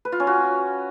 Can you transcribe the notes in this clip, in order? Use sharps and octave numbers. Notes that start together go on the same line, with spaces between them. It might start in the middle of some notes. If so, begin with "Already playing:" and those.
B4
F4
C#4
F#4